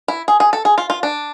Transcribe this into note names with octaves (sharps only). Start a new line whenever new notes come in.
E4
G#4
G#4
A4
G#4
F4
F4
D4